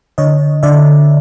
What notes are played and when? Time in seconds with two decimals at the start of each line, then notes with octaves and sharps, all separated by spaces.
0.18 D3 C#5 D#5
0.63 D3 D5 E5